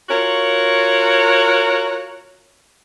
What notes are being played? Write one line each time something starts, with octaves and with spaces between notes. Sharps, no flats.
F4 F#4 A#4 C#5